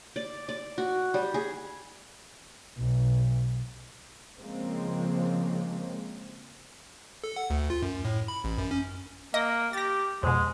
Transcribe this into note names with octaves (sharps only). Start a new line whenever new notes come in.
D5
D5
F#4
G3
G#4
B1
C#3 F3 G#3 A#3 C4
A4
F#5
D2
F4
F#2
A2
B5
A1
F#2
C#4
A#3 D#5
G4 A6 A#6
F2 B2 G#3